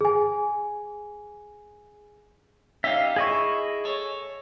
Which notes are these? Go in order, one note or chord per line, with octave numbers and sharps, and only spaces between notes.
G#4 G#5
C#4 D#4 G4 E5 F5
E4 G#4 D#5 C#6
A4 C#5